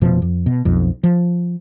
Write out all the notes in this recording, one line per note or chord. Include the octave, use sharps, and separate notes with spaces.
F1 B2 F3
F2
B2
B1 F2
F3